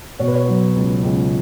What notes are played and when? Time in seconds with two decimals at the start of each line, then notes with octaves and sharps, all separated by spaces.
0.19 B2 C#5
0.28 B4
0.35 C#5
0.48 F#3
0.75 C#2
1.03 C#2